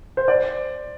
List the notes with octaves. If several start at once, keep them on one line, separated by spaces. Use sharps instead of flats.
C5
D5